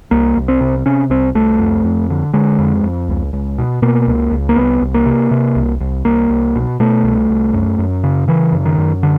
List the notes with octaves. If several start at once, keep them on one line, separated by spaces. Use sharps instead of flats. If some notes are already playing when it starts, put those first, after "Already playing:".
C2 A#3
C2
C4
C3
C3 C#4
C2 C4
C2 A3
F2
F2
D3
D3 G#3
F2
F2
C#2
C#2
B2
B2 A#3
C#2
C#2
A#3
C2 B3
C2
A#3
C3
C3
C2
C2
C2 A#3
C2
B2
B2 A3
C2
C2
F#2
F#2
C#3
C#3 E3
F#2
D#3
F#2
D3